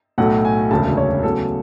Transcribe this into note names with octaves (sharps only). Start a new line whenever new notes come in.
B1 A2 F#3 A3 F#5
G#5
E1 D2 C#3 A5
C#5
E2 C#3 F#3 A3 A4